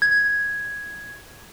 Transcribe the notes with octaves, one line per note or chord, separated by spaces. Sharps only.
G#6